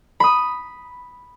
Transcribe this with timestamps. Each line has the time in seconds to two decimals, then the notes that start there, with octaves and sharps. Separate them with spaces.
0.20 B5 D#6